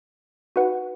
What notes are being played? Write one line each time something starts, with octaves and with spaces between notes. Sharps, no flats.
D#4 F#4 B4 F#5